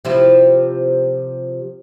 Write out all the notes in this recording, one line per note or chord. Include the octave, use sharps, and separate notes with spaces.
C3 F3 E4